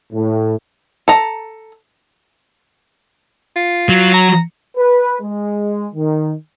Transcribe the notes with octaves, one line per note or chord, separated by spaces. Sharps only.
A2
A4 A#5
F4
F#3
A#5
B4
G#3
D#3